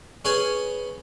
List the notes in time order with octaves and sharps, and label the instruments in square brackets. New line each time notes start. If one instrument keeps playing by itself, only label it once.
[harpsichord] C#4 G#4 B4 C#5 G#5